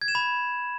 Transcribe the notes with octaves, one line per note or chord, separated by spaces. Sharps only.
G#6
E7
B5